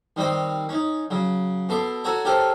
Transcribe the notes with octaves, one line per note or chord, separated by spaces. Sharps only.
D#3 G3 C4 C5 D#5
C#4 D#4
C#3 F#3
B2 A4 C6 D6
F#4 A4 C#5 A#5
C#4 G4 A4 A#4 C5